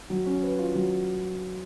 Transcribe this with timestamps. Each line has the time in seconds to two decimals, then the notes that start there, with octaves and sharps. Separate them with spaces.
0.10 F#3
0.26 C#4
0.43 B4
0.59 F4
0.75 F#3